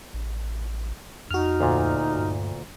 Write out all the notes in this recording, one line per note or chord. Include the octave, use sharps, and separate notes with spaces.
A1
F2 D#4 F#4 F6
D2 A#2
G2